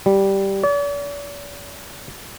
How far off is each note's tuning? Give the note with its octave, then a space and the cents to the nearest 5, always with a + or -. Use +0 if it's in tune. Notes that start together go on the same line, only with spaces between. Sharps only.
G3 -5
D5 -45